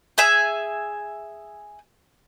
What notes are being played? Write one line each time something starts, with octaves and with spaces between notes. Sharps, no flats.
G#4 E5 G#5